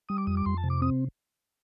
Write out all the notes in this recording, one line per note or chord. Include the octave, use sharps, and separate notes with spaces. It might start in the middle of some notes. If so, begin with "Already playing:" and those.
G3 D#6
D6
F2 D#6
D6
F2 C6
A5
C3
D6
C4 D#6